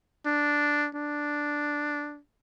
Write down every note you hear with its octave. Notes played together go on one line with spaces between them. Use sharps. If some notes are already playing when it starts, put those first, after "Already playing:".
D4
D4